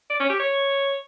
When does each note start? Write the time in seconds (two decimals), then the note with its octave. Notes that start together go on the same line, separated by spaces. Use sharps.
0.10 D5
0.20 C#4
0.30 G4
0.40 C#5